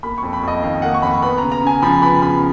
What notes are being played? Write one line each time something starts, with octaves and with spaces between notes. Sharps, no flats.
A#3 B5
F2 C#6
B5
F2 D#5
D#3 F5
A#3 F#5
C#6
F2 B5
B3 B5
C#3 A#5
A#5
C#3 G#5
F3 B5
B3 B5
C#3 B5